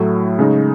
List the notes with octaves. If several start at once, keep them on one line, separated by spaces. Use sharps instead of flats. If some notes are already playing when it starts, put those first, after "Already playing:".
Already playing: A2 F#3 A3 E4
C#3 G#3 D#4